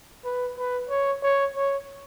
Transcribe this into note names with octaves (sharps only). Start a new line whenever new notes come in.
B4
B4
C#5
C#5
C#5